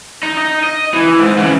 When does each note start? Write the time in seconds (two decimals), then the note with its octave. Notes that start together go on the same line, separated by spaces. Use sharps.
0.23 D#4
0.38 D#4
0.64 D#5
0.94 E3
1.19 G#2
1.39 C#3 E3